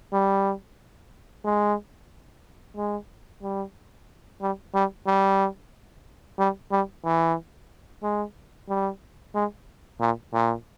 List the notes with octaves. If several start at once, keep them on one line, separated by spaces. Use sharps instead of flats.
G3
G#3
G#3
G3
G3
G3
G3
G3
G3
E3
G#3
G3
G#3
A#2
A#2